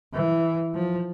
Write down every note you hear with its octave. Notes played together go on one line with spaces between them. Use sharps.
E3
F3